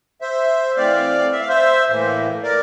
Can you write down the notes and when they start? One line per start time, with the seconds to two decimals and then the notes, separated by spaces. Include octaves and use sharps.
0.21 C5 E5
0.77 E3 A3 C4 D5 F5
1.32 E5
1.41 F5
1.49 C5 E5
1.88 A2 E3 A#3
2.44 A#4 D5